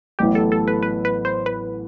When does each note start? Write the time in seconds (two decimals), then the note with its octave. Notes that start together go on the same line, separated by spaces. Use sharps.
0.19 A1 A2 F#3 B3 E4 G4
0.35 A4
0.52 A4
0.68 B4
0.83 B4
1.05 B4
1.25 C5
1.46 B4